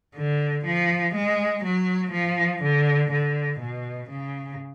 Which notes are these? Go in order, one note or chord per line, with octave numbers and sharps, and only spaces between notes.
D3
F3
G#3
F#3
F3
D3
D3
B2
C#3